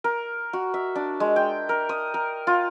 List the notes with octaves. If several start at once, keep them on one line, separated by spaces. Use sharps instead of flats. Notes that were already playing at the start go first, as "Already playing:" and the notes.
A#4
F#4
E5
D4
G#3
G5
A#4
D#6
A#4
F4